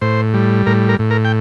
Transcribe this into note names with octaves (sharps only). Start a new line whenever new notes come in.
A2 C5
G3
A2 A#4
A#4
A2
A#4
G5